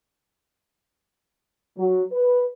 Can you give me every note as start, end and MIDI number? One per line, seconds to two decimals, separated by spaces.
1.77 2.02 54
2.12 2.44 71